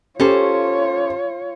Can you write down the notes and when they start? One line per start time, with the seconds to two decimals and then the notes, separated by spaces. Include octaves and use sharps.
0.20 C#4 F4 G4 A4 C5 C#5